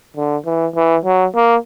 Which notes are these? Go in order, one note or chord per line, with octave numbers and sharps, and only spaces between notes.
D3
E3
E3
F#3
A#3